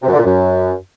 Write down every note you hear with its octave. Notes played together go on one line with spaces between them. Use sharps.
C3
F#2
D3
A#2
F#2